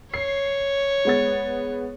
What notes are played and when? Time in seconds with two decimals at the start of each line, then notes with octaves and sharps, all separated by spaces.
0.14 C#5 C7
1.05 G#3 B3 A6